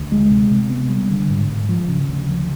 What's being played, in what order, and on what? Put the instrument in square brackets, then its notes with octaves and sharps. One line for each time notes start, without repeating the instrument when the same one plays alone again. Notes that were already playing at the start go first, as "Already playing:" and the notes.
Already playing: [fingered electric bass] D2
G#3
C3
C3
B3
G3
D3
G#2
G#2
F3
C#3
D2
F3